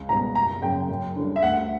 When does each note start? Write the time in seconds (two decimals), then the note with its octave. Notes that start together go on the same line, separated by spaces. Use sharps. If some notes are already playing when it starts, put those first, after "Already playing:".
Already playing: C#2
0.09 B2 G3 B3 A#5
0.35 F#1 A#5
0.62 F#2 C#3 G5
0.89 F#2
1.16 D3 G3
1.36 E5
1.43 D2 F#5